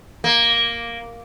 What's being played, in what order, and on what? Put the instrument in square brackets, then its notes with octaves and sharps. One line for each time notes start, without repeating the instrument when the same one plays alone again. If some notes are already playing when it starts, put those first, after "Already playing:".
[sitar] A#3